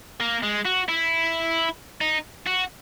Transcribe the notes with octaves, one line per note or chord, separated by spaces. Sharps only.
A#3
G#3
F#4
E4
D#4
F#4